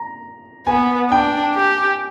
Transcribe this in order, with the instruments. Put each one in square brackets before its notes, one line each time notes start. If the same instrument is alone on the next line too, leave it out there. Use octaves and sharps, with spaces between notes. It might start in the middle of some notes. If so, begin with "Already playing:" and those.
Already playing: [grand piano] A#5
[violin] B3 [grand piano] G#5
[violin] D4 [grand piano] G5
[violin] G4